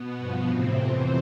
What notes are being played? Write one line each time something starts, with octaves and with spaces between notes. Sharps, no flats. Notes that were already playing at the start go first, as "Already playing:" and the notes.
Already playing: B2 B3
G2 F3
A2 C3 E3 C4
F2 E3